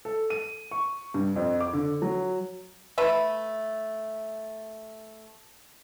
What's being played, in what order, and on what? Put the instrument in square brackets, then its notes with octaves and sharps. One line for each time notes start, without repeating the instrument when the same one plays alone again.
[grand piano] A4
D#7
C#6
G2
F2
D6
D3
F#3
[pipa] A3 B4 E5